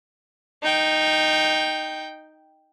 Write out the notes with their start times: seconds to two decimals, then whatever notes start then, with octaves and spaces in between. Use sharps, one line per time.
0.63 D#4 G5